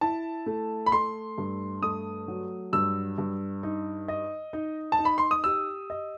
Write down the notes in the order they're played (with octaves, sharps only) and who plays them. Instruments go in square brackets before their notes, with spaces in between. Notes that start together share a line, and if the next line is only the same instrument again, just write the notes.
[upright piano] E4 [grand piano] A5
[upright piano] A3
[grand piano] B5
[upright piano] A3 [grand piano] C6
[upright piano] G2
[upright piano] A3 [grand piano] D#6
[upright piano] F#3
[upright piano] G2 [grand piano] E6
[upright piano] G2
D#4
D#5
D#4
[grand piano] A5
[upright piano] D#4
[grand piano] B5
C6
D#6
[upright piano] G4 [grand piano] E6
[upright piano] D#5